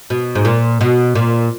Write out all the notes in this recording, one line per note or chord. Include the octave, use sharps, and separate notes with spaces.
B2
G#2
A#2
B2
A#2